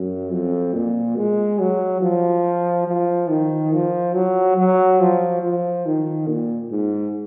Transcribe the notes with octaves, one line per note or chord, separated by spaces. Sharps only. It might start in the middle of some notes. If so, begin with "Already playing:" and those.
Already playing: F#2
F2
A#2
G#3
F#3
F3
F3
D#3
F3
F#3
F#3
F3
F3
D#3
A#2
G#2